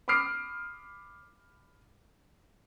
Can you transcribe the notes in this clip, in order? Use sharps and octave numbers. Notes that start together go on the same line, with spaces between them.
B5 D6 D#6 F6 C7 D7